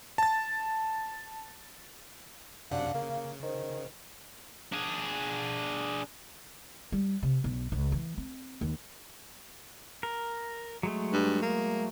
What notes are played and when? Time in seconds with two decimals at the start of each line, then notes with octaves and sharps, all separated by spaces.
0.18 A5 A6
2.71 F#2 C3 D4 F5 F#5
2.94 C#3 A#3
3.43 D#3 C5
4.72 D4 G#4
6.92 G3
7.23 C3
7.44 B1
7.72 C#2
7.92 E3
8.18 C4
8.61 D#2
10.03 A#4
10.83 F#3 G#3 A3
11.13 G2
11.42 A#3